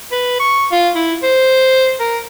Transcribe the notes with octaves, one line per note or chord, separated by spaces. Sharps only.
B4
C#6
F4
E4
C5
A#4